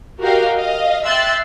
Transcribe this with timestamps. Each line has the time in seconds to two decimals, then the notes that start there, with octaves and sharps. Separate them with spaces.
0.20 F#4 G4 A#4 D#5 F5 G5
0.55 D#5 F5
1.04 E5 G5 C6 E6 F#6 A6